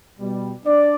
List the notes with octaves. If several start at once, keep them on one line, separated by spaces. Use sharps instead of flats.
B2 G3
D4 D5